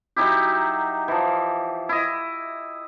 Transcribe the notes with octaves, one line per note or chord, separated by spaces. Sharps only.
F#3 D#4 E4 G4
E3 F3
E4 D#5